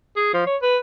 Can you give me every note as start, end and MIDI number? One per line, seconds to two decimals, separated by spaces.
0.16 0.29 68
0.34 0.46 53
0.47 0.56 73
0.62 0.77 71